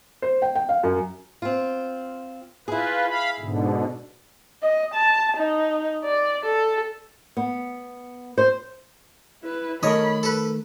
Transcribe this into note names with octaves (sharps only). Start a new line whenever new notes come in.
C5
G5
G5
F5
F#2
C4 F4
E4 F4 G#4 B4
F5 B5
G#2 B2 D3
D#5
A5
D#4
D5
A4
B3
C5
E4 B4
D#3 A3 A#4 C#5 D#5 B5
A4 B4